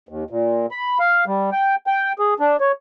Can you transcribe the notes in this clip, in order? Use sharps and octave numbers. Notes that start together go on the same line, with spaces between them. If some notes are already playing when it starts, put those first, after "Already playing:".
D#2
A#2
B5
F5
G3
G5
G5
G#4
D4
C#5